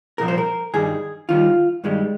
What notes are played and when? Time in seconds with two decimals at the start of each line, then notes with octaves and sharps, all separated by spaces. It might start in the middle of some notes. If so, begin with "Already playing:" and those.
0.18 C2 A#2 F3 A#4
0.28 C5
0.38 A#4
0.74 G2 D#3 G3 G#4
1.29 D#2 D#3 G3 F4
1.84 G2 D#3 G3 G#3